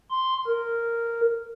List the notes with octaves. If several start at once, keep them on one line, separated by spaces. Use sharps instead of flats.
C6
A#4